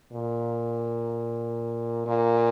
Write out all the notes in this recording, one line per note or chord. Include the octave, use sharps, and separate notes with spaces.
A#2
A#2